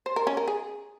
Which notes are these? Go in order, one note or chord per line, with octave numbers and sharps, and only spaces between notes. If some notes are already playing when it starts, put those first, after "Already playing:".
C5
A#4
C#4
A#4
G#4